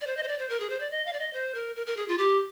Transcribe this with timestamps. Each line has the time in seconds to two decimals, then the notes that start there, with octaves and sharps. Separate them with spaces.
0.01 D5
0.07 C5
0.17 D#5
0.23 C5
0.28 D5
0.39 C5
0.49 A#4
0.60 G#4
0.70 C5
0.80 D5
0.91 D#5
1.06 F5
1.13 D5
1.19 D#5
1.33 C5
1.55 A#4
1.76 A#4
1.87 A#4
1.97 G#4
2.08 F4
2.18 G4